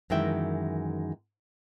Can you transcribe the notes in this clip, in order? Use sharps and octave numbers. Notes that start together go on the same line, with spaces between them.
F#2 D#3 E3 G#3 E5 G5